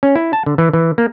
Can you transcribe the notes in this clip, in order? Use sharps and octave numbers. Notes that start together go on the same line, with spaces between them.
C#4
E4
A5
D3
E3
E3
A#3